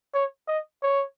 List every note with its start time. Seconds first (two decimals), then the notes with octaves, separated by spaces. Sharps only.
0.14 C#5
0.48 D#5
0.83 C#5